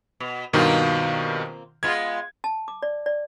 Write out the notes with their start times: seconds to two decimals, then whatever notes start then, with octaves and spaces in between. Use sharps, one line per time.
0.20 B2
0.53 G2 B2 D#3 A#3 C4 F4
1.83 G#3 B3 F4 G#6
2.44 A5
2.68 D6
2.83 D5
3.06 D5